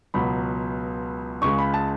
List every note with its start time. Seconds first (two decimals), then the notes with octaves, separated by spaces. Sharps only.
0.14 C#2 B2 F#3 B5
1.42 C#2 C#3 G#3 C#6
1.58 B5
1.74 A5